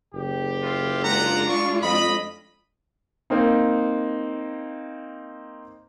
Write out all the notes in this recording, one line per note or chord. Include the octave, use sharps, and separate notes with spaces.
F#1 G4
E4 F4
G#3 D4 F4 F#5 A#5
D5 C#6
F2 D#5 B5
A#3 C4 D#4